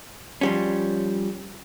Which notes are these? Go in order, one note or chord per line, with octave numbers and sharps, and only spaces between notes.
F3 G3 C#4